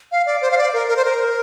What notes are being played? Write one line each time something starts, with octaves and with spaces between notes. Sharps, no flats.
F5
D5
C5
F5
D5
A#4
A#4
C5
A#4